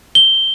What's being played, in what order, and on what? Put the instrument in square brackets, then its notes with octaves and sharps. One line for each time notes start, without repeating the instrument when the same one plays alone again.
[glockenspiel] G7